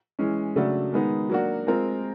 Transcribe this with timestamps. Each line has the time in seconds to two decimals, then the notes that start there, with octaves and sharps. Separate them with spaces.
0.19 E3 G#3 C#4
0.56 C#3 F#3 A3 D4 F#4
0.93 D#3 G#3 B3 D#4
1.30 F#3 A#3 D4 F#4
1.67 G#3 C4 F4 A#4